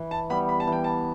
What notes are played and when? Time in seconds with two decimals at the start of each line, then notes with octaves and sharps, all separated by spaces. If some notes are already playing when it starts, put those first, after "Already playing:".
Already playing: E3
0.11 A5
0.30 G3 B3 B5
0.49 B5
0.60 A5
0.67 E3 G5
0.84 A5